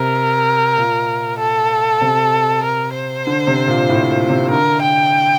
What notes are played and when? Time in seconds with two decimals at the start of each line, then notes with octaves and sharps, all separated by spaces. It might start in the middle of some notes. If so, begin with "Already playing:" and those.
Already playing: C3 A#4
0.77 A#2
1.39 A4
2.01 C3
2.64 A#4
2.95 C5
3.27 D3
3.47 C3
3.67 A#2
3.89 A2
4.10 A#2
4.30 C3
4.51 D3 A#4
4.82 G5